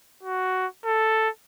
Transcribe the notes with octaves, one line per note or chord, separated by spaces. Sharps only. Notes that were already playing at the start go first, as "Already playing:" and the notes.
F#4
A4